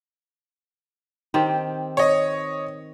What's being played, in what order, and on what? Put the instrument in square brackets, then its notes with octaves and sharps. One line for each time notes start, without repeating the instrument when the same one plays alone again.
[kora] D#3 C4 G4
[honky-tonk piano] C#5 D#5